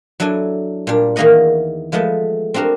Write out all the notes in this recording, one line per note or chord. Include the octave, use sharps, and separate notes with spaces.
F#3 D4 E4 A4 G#5
A#2 G3 D4
E2 D#3 A#3 G#4 D#5 F#5
F3 G#3 A3 B3 A5
C4 D4 F#4 G4 A#4